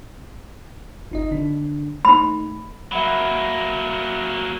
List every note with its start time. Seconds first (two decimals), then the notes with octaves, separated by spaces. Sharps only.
1.11 G1 D#4 D#5
1.31 D3 D4
2.05 A3 D#4 B5
2.92 F#3 A#3 E5 F#5 B5